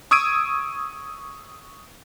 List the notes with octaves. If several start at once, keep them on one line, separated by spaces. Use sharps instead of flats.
C#6 D#6 E6 G#6 D7 D#7